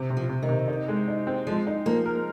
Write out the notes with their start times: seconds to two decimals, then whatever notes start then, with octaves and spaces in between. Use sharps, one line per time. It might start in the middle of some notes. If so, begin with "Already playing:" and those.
Already playing: C3
0.10 C3
0.17 F3
0.29 C3
0.43 D#3
0.49 C3
0.68 D#4
0.88 G#3
1.08 D#4
1.27 C4
1.47 F3 G#3
1.67 D#4
1.86 F3 A#3
2.06 A#4